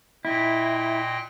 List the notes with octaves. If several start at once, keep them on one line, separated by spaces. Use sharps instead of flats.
A#2 E4 D#5 G5